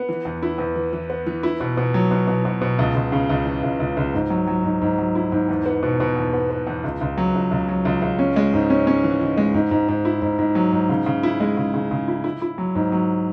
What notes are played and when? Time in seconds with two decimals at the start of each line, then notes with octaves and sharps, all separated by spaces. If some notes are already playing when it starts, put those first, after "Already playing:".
Already playing: B3
0.09 E3
0.25 E2
0.43 E4
0.58 E2
0.76 E3
0.93 E3
1.10 B3
1.26 E3
1.43 E4
1.60 B2
1.77 B2
1.94 F#3
2.11 B2
2.28 B2
2.45 B2
2.61 B2
2.79 C#2
2.95 C#2
3.12 C#3
3.30 C#2
3.46 E3
3.63 C#2
3.80 C#2
3.97 C#2
4.14 G#2
4.30 F#3
4.47 F#3
4.64 G#2
4.82 G#2
4.98 F#3
5.15 E4
5.32 G#2
5.49 E2
5.66 B3
5.83 B2
6.00 B2
6.16 E2
6.33 B3
6.50 B3
6.67 E2
6.84 C#2
7.01 C#2
7.18 F#3
7.35 C#2
7.51 C#2
7.68 F#3
7.85 C#2
8.02 C#2
8.19 C#4
8.36 G#3
8.54 G#2
8.70 C#4
8.87 C#4
9.04 E3
9.21 E3
9.37 G#3
9.54 G#2
9.71 G#2
9.88 G#2
10.05 E4
10.22 G#2
10.39 G#2
10.55 F#3
10.72 G#2
10.89 C#3
11.06 C#3
11.23 E4
11.40 G#3
11.57 C#3
11.74 C#3
11.91 C#3
12.08 E4
12.24 E4
12.42 E4
12.58 F#3
12.75 G#2
12.92 F#3